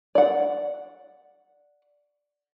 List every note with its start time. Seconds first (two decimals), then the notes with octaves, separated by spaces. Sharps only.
0.15 D5 F#5